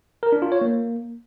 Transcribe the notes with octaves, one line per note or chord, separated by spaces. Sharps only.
A#4
D4
F4
C#5
A#3